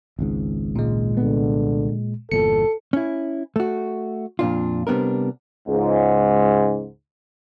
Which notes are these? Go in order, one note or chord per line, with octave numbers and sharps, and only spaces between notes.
G#1 C#2 G#2
A#2 G#3
C2 D3 B3
G1 E2 A#2 A4 C#7
C#4 E4
A3 F#4
F2 A#2 D4 F4
C3 G3 B3 D4 A#4
C#2 G#2